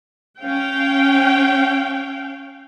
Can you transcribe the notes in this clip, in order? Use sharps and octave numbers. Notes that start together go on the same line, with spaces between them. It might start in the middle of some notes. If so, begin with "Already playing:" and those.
C#4 F5 G5